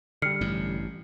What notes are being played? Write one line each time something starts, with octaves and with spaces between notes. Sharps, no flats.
D3 G3 F6 C7 C#7
A1 G2